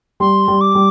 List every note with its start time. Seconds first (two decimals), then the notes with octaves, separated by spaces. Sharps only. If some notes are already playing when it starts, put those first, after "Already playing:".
0.20 G3 C6
0.48 G3
0.61 D6
0.75 G3